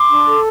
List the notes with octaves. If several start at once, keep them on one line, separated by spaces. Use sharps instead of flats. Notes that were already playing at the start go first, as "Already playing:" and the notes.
Already playing: C6 D6
D4
A4